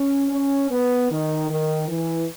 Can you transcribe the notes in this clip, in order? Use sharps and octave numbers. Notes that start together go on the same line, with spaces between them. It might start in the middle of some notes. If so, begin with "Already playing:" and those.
Already playing: C#4
C#4
B3
D#3
D#3
E3